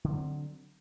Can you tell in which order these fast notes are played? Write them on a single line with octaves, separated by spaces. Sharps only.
D3 E3 F#3 C4